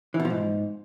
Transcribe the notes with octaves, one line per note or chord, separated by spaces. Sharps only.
E3
B2
F3
G#2